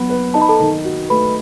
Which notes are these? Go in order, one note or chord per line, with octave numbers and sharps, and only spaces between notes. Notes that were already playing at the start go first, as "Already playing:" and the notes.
Already playing: F#3 B3
B4
D#4 A5
B5
A4 A5
D#3
F#4
A3 B4 B5